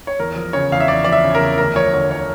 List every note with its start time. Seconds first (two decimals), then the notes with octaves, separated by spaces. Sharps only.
0.07 C#5
0.20 E2 A#4
0.36 F3
0.53 C#3 C#5
0.72 E2 F5
0.80 E5
0.88 E2 D5
1.05 F3 D5
1.12 E5
1.23 C#3
1.35 A#4
1.41 E2
1.58 D2 A#4
1.76 F3 C#5
1.93 D3 C#5
2.11 C#5